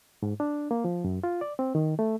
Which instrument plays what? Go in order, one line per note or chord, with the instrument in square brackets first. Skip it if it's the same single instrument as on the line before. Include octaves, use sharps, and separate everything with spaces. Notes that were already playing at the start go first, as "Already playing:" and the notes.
[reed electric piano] G#2
D4
A#3
F3
F#2
F4
D5
C4
D#3
A3